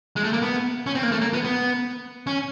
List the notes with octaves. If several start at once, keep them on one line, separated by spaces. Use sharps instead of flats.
G#3
A3
A#3
B3
C#4
C4
A#3
A3
A#3
B3
B3
C#4